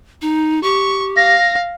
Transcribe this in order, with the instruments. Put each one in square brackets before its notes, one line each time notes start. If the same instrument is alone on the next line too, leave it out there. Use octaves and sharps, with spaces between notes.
[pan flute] D#4
[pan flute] G4 [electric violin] C#6
[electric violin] F5 [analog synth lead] A#6